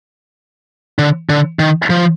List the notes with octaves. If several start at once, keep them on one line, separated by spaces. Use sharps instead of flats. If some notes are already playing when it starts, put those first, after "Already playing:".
D3
D3
D#3
F3